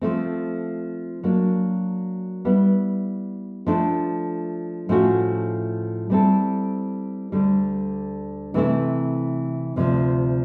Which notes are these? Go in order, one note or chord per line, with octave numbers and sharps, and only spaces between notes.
F3 A3 C4
F#3 A#3 D4
G3 B3 E4
F3 A3 D4
A2 F3 A3 C#4 F#4
G3 C4 E4 A4
D2 D3 G3
C3 E3 A3 C4 E4
D2 C3 F3